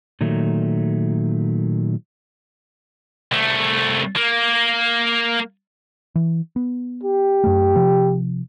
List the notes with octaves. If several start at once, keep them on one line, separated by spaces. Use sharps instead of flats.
A#2 D#3 F#3 A3
C2 A3
A#3
E3
B3
G4
F#2 A3
C3 F3